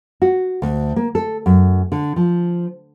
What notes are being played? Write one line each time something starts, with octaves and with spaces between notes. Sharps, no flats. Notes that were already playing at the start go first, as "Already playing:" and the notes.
F#4
D2
A#3
A4
F#2
D3
F3